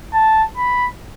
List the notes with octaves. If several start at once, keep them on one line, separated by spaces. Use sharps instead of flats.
A5
B5